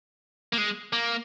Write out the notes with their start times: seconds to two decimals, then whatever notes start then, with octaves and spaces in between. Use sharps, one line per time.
0.53 A#3
0.58 G#3
0.93 A#3